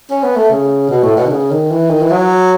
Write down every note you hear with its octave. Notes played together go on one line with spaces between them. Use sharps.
C#4
B3
A3
C#3
B2
A2
B2
D#3
C#3
D#3
E3
D#3
E3
F#3